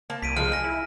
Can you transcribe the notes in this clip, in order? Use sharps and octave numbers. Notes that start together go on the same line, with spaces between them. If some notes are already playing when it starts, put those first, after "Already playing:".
A#3 A5
C2 B6 D7 D#7
F3 G#3 D#4 F6
G#5 F6 A#6
E4